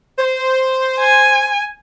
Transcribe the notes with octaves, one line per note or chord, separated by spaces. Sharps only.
C5
G#5